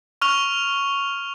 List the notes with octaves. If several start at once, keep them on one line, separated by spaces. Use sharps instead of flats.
C#6 F6 F7